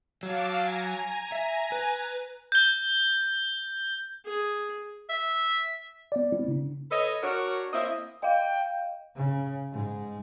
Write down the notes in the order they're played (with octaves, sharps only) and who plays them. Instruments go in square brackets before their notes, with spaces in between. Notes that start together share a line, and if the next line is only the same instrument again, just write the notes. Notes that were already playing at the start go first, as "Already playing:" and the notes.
[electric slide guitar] F#3 [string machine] F5 A5 D6
[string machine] G#5 A#5
[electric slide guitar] E5
B4
[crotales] G6 G7
[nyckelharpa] G#4
[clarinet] E5
[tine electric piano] B3 D5
G#3 B3 C4 E4
C#3 D4
[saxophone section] A4 B4 C#5 D#5
D4 F#4 A#4 C#5
A#3 C4 E4 D#5 E5
[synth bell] D#5 F5 [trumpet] G5
[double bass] C#3
G#2 G#3